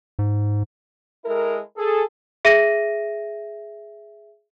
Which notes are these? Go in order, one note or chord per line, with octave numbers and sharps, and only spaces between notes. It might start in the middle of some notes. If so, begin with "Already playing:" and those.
G#2
G#3 E4 A4 A#4
G#4 A4
G#4 E5 A#6 D#7